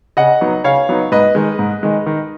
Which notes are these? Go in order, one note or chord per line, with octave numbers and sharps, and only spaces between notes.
C#3 D#5 F#5
F#3 B3 D#4
C#3 C#5 F5
F#3 B3 D#4
G#2 B4 D#5
D#3 G#3
G#2
D#3 G#3
D#3